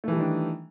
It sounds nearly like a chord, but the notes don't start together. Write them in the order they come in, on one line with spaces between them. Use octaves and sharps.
A3 E3 G3 D#3 D4